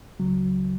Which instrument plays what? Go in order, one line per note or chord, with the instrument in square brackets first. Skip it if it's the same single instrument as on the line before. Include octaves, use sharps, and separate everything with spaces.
[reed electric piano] C#2 C#3 F#3